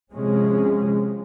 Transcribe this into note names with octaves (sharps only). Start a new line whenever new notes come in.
C3 F3 G#3 C#4